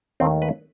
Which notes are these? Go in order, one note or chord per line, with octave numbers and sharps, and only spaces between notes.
D#2 D#3 A3 C4
B4